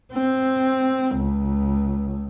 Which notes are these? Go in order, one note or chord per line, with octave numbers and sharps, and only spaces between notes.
C4
C#2